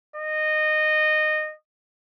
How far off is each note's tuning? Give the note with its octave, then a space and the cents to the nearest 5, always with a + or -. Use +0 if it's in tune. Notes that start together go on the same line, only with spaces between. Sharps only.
D#5 -20